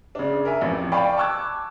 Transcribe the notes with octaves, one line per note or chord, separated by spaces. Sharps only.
C#3 D4
A#4 E5 G#5
A1 F2
D5 F5 G5 G#5 B5 C#6
A5 C#6 D6 E6 F#6 G#6